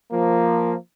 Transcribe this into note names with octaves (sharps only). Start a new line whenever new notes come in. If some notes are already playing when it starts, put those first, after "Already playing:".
F3 A#3